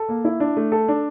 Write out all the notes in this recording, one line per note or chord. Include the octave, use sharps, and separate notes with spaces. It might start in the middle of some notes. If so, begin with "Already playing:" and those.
Already playing: A4
A#3
E4
D4
A3
A4
D4